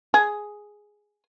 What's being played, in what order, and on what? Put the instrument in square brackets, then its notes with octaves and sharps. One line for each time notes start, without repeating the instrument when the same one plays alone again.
[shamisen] G#4